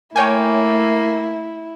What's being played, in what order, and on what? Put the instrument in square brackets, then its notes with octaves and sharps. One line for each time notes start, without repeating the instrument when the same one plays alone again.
[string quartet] A3 [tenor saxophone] A#3 [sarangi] E4 [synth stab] C#5 G5 G#5